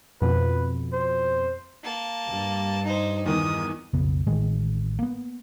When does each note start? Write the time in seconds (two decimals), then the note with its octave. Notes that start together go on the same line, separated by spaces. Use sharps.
0.21 F2 B2 B4
0.93 C5
1.83 A#3 A5
2.25 G2 G3
2.84 D#4 C5
3.26 E2 D#3 E3 D#6
3.93 B1 F2 C#3 B3
4.27 A1 A2 D#3 G#3
4.99 A#3 B3